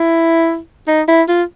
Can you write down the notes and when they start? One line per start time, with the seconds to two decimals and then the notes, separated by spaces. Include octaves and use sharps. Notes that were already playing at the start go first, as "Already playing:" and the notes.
Already playing: E4
0.87 D#4
1.08 E4
1.28 F4